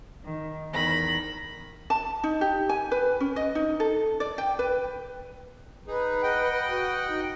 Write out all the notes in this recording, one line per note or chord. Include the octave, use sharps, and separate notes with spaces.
D#3
E2 D#3 B5 A#6
A5
D#4
G4
G#5
B4
C#4
D#5
D#4
A4
D5
G5
B4
D#4 G#4 B4
D#5 F#5 G5
F#4
D#4